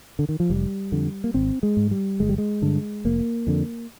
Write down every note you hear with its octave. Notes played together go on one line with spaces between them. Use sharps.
D3
D#3
F3
F1 G3
F2 D3
A#3
G#1 C4
G#3
G#2
G3
G1 G#3
G3
G#3
G2 D3
F1 A#3
F2 D3